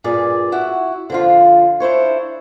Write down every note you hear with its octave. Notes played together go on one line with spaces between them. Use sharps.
G2 A#2 G#4 D5
E4 F#4 F#5
D3 F3 F4
D4 E4 C5 C#5